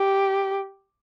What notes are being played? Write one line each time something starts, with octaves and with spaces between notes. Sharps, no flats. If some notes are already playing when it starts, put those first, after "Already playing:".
Already playing: G4